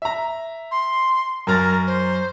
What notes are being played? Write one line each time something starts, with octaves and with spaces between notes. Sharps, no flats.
E5 A#5
C6
F#2 A#4 A#5 A6
C5